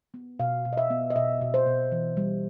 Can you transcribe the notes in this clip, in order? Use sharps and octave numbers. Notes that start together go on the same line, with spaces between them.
B3
B2 F5
B2
D#5
E5
B3
D#5
B2 E5
B2
C5
B2
E3
G3